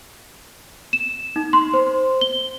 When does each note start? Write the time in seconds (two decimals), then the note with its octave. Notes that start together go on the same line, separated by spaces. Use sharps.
0.93 E7
1.36 D#4
1.53 C6
1.74 C5
2.21 G7